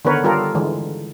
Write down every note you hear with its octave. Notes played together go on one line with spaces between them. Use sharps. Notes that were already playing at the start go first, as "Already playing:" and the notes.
D3 D#3 B3 A#4 B4 C#5
G3 F4 G4 A4 A#4
D3 E3 G#3